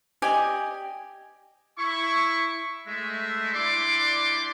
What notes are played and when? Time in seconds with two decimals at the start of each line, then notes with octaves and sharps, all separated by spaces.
0.22 G4 D5 D#5 G#5
1.78 E4 C#6
2.86 G#3 A3 E5
3.54 G3 D4 E4 D5 C6 D6